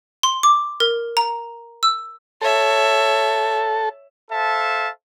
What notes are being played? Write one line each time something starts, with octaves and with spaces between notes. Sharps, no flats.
C6
D6
A#4
A#5
E6
A4 C#5 E5
A4 C5 E5 F5 A5